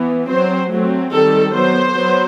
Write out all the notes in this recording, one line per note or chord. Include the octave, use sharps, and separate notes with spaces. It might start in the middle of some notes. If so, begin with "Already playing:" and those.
Already playing: E3 B3
F#3 C4 C5
F#3 A3 C4
D#3 G3 C4 A4
F#3 B3 C5
F#3 B3